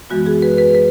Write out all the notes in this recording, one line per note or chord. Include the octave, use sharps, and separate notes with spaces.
F#2 E3 G#3 B3 F#4
G#4
B4
B4
B4